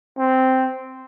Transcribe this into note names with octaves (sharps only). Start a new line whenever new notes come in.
C4